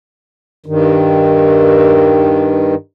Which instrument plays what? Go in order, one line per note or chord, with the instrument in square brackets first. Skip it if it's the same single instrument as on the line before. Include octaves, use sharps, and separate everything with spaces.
[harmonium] G2 D#3